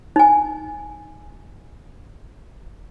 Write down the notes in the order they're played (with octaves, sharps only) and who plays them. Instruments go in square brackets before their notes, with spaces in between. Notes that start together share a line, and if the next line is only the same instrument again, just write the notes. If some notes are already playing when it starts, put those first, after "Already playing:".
[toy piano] D#4 G#5